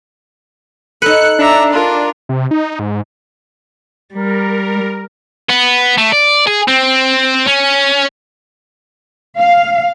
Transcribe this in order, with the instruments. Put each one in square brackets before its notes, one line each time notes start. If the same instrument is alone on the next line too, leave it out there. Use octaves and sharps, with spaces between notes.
[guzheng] D#4 B4 [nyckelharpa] A4 [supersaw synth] F#6 C#7
[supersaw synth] D4 [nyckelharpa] E5 A#5
[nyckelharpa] F4 A#4
[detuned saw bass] C3
D#4
G#2
[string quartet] G3 [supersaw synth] A#4
[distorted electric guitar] B3
A3
D5
G#4
C4
C#4
[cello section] F5